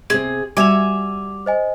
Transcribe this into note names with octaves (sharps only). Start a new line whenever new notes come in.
C3 C4 G#4
G3 F#4 E5 G#5 D6 F7
C5 D#5 G#5